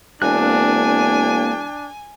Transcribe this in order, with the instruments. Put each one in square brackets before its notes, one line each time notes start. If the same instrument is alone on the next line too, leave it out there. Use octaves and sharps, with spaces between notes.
[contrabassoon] E1 [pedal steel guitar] A#3 C4 F#6 [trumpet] D4 [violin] G#5